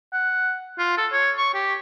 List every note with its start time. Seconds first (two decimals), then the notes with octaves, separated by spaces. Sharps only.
0.13 F#5
0.78 F4
0.98 A4
1.12 C#5
1.38 C#6
1.54 G4